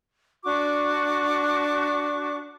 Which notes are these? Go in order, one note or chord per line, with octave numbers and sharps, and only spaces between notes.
D4 F#4 C#6 D6